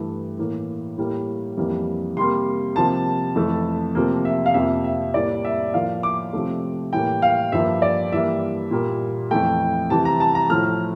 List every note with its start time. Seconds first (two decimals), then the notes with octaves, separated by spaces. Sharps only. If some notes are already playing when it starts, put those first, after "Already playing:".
Already playing: G2 E3 A3
0.39 A2 E3 A#3
0.98 A2 G3 A#3
1.57 F2 E3 G3 A#3
2.17 C3 G3 A#3 C6
2.76 C3 F3 A#3 A5
3.36 F2 E3 A3
3.95 C3 F3 A#3
4.25 E5
4.46 F5
4.54 F2 C3 F3 A#3 E5
4.84 E5
5.14 A2 G3 A#3 D5
5.45 E5
5.74 A2 F3 A#3 F5
6.03 D6
6.33 C3 F3 A3
6.93 A2 E3 G3 A#3 G5
7.22 F5
7.52 G2 F3 A#3 E5
7.82 D5
8.12 G2 E3 G3 A#3 E5
8.71 A#2 G3 A#3
9.31 F2 E3 A3 G5
9.90 C3 E3 G3 A5
10.05 A#5
10.20 A5
10.35 A#5
10.50 A2 F3 A3 F6